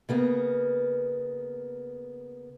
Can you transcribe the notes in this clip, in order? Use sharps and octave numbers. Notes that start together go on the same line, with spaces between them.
C#3 A#3 B3